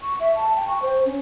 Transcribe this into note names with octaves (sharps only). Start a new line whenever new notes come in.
C#6
E5
A5
G5
C#6
C5
C#4